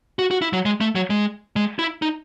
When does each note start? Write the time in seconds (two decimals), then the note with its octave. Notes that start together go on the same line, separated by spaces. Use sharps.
0.19 F#4
0.31 F#4
0.42 E4
0.53 F#3
0.65 G#3
0.81 A3
0.95 F#3
1.10 G#3
1.56 G#3
1.79 E4
2.02 D#4